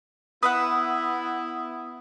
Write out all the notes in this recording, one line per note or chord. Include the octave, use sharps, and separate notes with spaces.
B3 E4 B4 E5 F#5 D#6